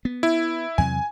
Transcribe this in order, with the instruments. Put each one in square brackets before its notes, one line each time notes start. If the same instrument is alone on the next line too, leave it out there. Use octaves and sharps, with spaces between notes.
[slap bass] B3
[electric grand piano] E4
[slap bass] E2 C3 F#3 [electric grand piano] G#5